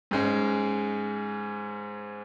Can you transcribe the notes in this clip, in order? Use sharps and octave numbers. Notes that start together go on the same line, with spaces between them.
G#2 G#3 C#4